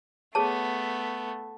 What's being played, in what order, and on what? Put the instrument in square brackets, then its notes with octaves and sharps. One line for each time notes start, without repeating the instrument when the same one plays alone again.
[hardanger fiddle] A3 B3 [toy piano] G#4 C#5 A5